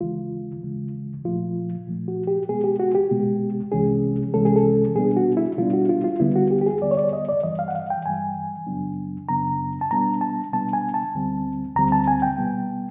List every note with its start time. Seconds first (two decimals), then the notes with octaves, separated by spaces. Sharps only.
0.01 D#2 C#3 E3 G#3 F4
0.63 D#2 C#3 E3 G#3
1.24 A#2 F3 A3 F4
1.87 A#2 F3 A3
2.08 F#4
2.27 G4
2.49 B2 G#3 B3 G#4
2.64 G4
2.80 F#4
2.95 G4
3.11 B2 G#3 B3
3.72 C2 C3 E3 G#3 C#4 G#4
4.34 C2 C3 E3 G#3 C#4 A4
4.45 G#4
4.56 A4
4.95 B2 G3 B3 D4 G#4
5.16 F#4
5.37 E4
5.58 B2 G3 B3 D4 F4
5.73 F#4
5.89 F4
6.04 F4
6.20 D#2 D3 G3 B3 E4
6.35 F#4
6.51 G4
6.61 G4
6.66 G#4
6.81 D#2 D3 G3 B3 D5
6.91 C#5
6.97 D5
7.13 D#5
7.29 D5
7.43 G2 E3 G3 D#5
7.59 F5
7.68 F#5
7.75 F5
7.90 G5
8.06 G2 E3 G3 G#5
8.67 F#2 C#3 F#3 B3 D4
9.29 F#2 C#3 F#3 B3 D4 A#5
9.81 A5
9.91 B2 G3 B3 D4 A#5
10.21 A5
10.52 B2 G3 B3 D4 A5
10.73 G#5
10.94 A5
11.15 D2 D3 G3 C4
11.76 D2 D3 G3 C4 A#5
11.92 A5
12.08 G#5
12.22 G5
12.38 B2 G3 B3